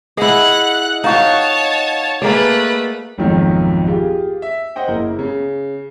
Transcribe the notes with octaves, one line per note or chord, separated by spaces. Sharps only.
E4 G#4 D#5 F#5 F#6
D#4 F#4 C#5 F5 A5
A3 A#3 G#4 B4 D5
G#1 F2 B2 D#3 F3 F#3
F4 G4 G#4
E5
C5 D#5 F#5 G5
F#1 E4 A#4
C#3